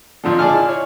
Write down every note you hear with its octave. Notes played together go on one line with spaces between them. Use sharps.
F2 A#2 D3
G#4 D5 D#5 G#5 A5 F6
E4
C#5